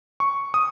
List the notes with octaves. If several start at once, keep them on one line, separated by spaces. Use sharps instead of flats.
C#6
D#6